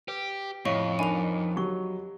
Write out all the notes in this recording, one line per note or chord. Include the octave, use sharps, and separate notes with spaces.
G4 B4
F2 A2 C#5 D#5 F5 C#6
D4 D#4 A#4 G#5 B5 F7
F#3 G4 C#6